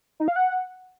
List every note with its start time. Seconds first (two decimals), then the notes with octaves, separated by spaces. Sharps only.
0.20 D#4
0.28 F5
0.36 F#5